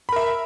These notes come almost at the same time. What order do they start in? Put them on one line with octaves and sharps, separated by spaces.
B5 A#4 E5